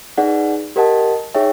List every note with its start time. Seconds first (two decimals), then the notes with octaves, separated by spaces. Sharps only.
0.18 D#4 G#4 B4 D5 F#5
0.76 G4 A#4 D#5 F#5 A5
1.35 D#4 G#4 C#5 E5 G5